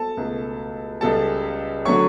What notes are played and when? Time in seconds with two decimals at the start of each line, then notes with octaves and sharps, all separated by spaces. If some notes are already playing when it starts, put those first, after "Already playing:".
Already playing: A4 A5
0.17 C#2 B2 A3
1.01 C#2 C#3 G3 A4 A5
1.85 D3 F#3 A3 C#5 C#6